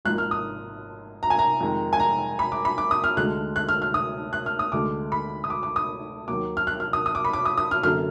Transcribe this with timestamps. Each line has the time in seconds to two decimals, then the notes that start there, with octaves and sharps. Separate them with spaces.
0.05 G#1 G#2 F3 A#3 F#6
0.18 F6
0.31 D#6
1.23 A#5
1.30 G#5
1.39 A#5
1.60 F2 D#3 G#3
1.93 G#5
2.00 A#5
2.39 B5
2.52 D6
2.65 B5
2.78 D6
2.91 D#6
3.04 F6
3.17 D2 D3 G#3 F#6
3.56 F#6
3.69 F6
3.82 F6
3.94 D#6
4.33 F#6
4.46 F6
4.59 D#6
4.72 D2 D3 G#3 D6
5.12 B5
5.44 D#6
5.50 D6
5.63 D6
5.76 D#6
6.28 D#2 D#3 F#3 A#3 D6
6.57 F6
6.67 F#6
6.80 F6
6.93 D#6
7.06 D#6
7.15 D6
7.25 B5
7.33 D6
7.45 D#6
7.58 D#6
7.71 F6
7.83 F#2 D3 F#3 A#3 F6